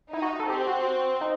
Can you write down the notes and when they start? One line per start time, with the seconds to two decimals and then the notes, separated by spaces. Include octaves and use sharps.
0.13 D#4 E4
0.22 F#4
0.39 A4
0.49 C4 G4
0.67 F#4
1.21 D#4